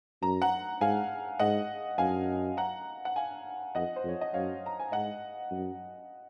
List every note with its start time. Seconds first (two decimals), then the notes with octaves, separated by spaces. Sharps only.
0.22 F#2 A#5
0.42 F#5 A#5
0.81 G#2 F5 G#5
1.39 G#2 D#5 F#5
1.98 F#2 F5 G#5
2.57 F#5 A#5
3.05 F#5
3.16 F5 G#5
3.75 F2 D#5 F#5
3.96 C5
4.04 F2
4.08 C#5
4.21 D#5
4.34 F#2 C#5 F5
4.66 A#5
4.80 G#5
4.92 G#2 D#5 F#5
5.51 F#2